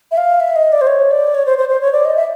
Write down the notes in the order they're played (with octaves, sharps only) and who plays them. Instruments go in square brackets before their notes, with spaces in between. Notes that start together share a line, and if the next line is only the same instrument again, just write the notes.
[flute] E5
F5
E5
D#5
D5
C5
C#5
D5
C#5
C5
C5
C5
C#5
D5
D#5
E5